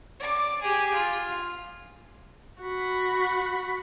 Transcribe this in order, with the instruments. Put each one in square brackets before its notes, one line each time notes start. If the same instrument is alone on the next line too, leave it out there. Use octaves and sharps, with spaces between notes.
[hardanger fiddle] D5 D6
G4 G#4
F4
[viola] F#4 B5